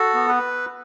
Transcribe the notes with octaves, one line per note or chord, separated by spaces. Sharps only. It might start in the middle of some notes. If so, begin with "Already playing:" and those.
Already playing: F#4 A4
B3
B4